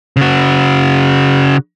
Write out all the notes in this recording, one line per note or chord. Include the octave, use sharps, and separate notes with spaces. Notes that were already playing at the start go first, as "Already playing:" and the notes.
C#3 F#4